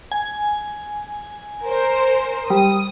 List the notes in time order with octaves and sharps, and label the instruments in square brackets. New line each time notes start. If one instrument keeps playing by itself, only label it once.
[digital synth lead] G#5
[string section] A#4 C5
[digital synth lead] G3 [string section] D#6